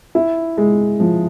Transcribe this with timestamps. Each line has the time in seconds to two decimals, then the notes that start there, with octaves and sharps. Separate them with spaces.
0.15 E4
0.57 G#3
1.00 F3